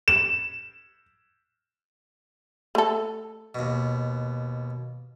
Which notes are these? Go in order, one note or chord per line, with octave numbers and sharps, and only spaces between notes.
E7
A3 A4
D#2 B2